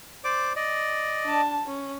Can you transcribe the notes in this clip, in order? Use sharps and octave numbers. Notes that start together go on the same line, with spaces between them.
C5 D5 D6
D5 D#5
D4 A5
C#4